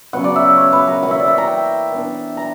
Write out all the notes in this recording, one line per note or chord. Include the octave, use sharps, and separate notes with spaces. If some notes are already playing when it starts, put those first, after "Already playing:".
C#3 F#3 B3 F#5
D5
E5
C#5
B4
A#4
E3 A#3 E4 F#5
E5
D5
E5
A#5
G5
E3 B3 D4
A#5